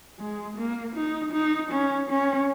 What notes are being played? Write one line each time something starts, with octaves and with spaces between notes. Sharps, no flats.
G#3
A#3
D#4
D#4
C#4
C#4